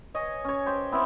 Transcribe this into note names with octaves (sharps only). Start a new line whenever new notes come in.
C#5 D#5 G#5
C#4 C#5
G4 C5 C#5 G5
B3 C4 E4